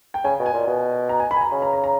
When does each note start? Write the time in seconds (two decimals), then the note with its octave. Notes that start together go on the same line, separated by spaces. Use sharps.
0.14 G5
0.24 C#3 G#5
0.39 B2
0.46 G#5
0.53 A#2
0.67 B2
1.09 A#5
1.20 G#5
1.31 B5
1.36 G#5
1.41 A#5
1.52 C#3
1.62 A#5
1.73 A#5
1.84 A#5